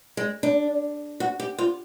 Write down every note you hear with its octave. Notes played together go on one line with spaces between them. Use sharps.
G#3
D4
F#4
G4
F4